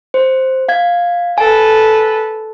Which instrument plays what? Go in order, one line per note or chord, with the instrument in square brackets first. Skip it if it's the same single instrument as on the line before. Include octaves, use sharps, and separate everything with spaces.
[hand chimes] C5
F5 G#6
[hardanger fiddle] A4 B4 [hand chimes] G#5